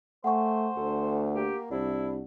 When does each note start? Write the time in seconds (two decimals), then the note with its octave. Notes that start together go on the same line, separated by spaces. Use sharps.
0.24 A3 C5 F#5 G#5 C#6
0.77 D2 A4
1.35 A#3 G4
1.71 C2 D4 E4